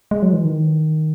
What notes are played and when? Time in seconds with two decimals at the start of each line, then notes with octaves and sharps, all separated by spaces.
0.11 G#3
0.22 F#3
0.33 E3
0.45 D#3